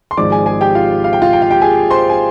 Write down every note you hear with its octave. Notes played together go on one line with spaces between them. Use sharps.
C6
G#1 G#2 F3 G#3 D5 D6
G#4 G#5
G#4 G#5
G4 G5
F4 F5
F5
G5
F4 F5
G5
F5
G4 G5
G#4 G#5
C5 C6
G#5